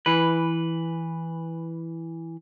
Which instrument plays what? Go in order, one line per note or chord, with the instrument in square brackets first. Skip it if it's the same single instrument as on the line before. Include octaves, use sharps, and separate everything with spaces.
[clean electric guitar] E3 B4